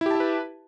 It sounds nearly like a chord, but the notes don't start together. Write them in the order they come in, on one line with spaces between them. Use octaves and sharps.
E4 G4 A5 E5 B4